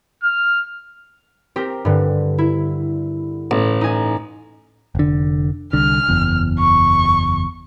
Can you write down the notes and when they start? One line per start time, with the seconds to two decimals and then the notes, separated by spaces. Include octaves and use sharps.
0.23 F6
1.56 C4 G4 A#4
1.85 G2 D3
2.38 E4
3.51 A1
3.81 D#4 G#5
4.95 F1 D3
5.73 C2 D3 F6
6.09 F#1 E2
6.59 C#6